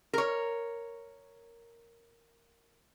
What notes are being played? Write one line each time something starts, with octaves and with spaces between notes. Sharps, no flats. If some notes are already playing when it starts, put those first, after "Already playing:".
A#4 C#5